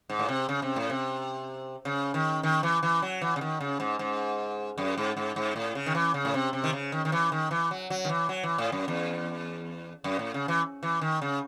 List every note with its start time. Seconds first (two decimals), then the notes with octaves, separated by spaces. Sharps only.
0.10 G#2
0.19 A2
0.29 C3
0.49 C#3
0.62 C3
0.76 A2
0.90 C3
1.85 C#3
2.14 D#3
2.43 D#3
2.63 E3
2.83 E3
3.02 F#3
3.21 E3
3.36 C#3
3.41 D#3
3.60 C#3
3.80 G#2
3.99 G#2
4.78 F#2
4.98 G#2
5.17 G#2
5.36 G#2
5.56 A2
5.75 C#3
5.86 D#3
5.95 E3
6.14 C#3
6.25 A2
6.34 C3
6.53 C3
6.64 D#3
6.73 C#3
6.92 D#3
7.05 D#3
7.12 E3
7.32 D#3
7.51 E3
7.71 F#3
7.90 F#3
8.05 D#3
8.09 E3
8.29 F#3
8.43 E3
8.58 A2
8.72 F#2
8.88 E2
10.04 F#2
10.19 A2
10.34 C#3
10.48 E3
10.83 E3
11.01 D#3
11.22 C#3